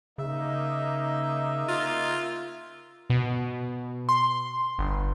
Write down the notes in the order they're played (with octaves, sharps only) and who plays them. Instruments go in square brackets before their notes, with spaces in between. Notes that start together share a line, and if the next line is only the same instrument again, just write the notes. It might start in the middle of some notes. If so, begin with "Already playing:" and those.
[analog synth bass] C#3 [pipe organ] A#3 D#4 [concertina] E5
[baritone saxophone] F4
[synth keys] B2
C6
G1